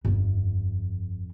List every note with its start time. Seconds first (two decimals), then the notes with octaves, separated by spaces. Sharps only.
0.05 G1 F2